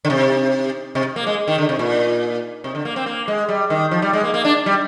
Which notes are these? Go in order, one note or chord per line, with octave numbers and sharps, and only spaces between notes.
D3
C3
C3
A#3
G#3
D#3
D3
C3
A#2
C3
D3
A#3
C4
A#3
G#3
G3
D#3
F3
G3
G#3
A#3
A#3
D4
G3